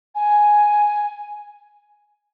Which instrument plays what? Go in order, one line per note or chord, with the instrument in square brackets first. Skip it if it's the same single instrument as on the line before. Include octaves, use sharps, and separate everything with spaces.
[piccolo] G#5